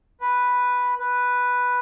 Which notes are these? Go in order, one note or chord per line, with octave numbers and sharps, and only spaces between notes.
B4
B4